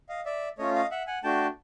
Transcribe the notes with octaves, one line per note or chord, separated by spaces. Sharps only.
D#5 F5
D5 E5
A3 C#4 F4 C#5 D#5
D#5 F5
E5 F#5
F#5 G#5
A3 D4 F#4 G5 A5